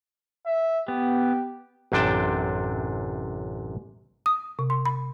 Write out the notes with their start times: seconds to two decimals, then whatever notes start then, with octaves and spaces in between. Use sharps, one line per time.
0.46 E5
0.88 B3 G4
1.92 A1 F#2 C3 D4 G5 A5
4.26 D#6
4.59 C3
4.70 C6
4.86 B5